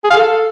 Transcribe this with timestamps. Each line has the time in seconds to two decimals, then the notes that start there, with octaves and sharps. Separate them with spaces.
0.04 G#4
0.10 F5
0.16 A4